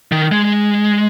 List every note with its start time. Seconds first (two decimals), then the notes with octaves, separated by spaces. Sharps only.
0.12 D#3
0.32 G#3